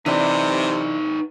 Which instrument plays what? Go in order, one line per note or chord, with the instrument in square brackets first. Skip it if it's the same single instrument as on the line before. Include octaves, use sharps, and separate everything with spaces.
[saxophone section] C3 [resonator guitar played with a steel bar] E3 D4 [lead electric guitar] D#4 B4